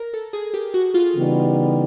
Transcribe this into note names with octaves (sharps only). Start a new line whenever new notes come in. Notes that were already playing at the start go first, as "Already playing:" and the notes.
Already playing: A#4
A4
G#4
G4
F#4
F4
C#3 E3 G3 B3 D#4